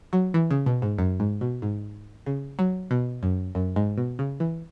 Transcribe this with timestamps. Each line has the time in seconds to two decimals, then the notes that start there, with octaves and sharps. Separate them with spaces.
0.13 F#3
0.34 E3
0.51 C#3
0.66 B2
0.82 G#2
0.98 F#2
1.20 G#2
1.41 B2
1.62 G#2
2.26 C#3
2.59 F#3
2.91 B2
3.23 F#2
3.55 F#2
3.76 G#2
3.98 B2
4.19 C#3
4.40 E3